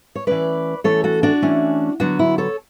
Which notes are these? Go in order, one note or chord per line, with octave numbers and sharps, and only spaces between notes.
C#5
E3 A3 C#4 B4 D5
E3 A3 C#4 A4 C#5
F#4 A4
D4 F#4
E3 A3 C#4
D3 F#3 B3 D4 F#4
E4
A4 C#5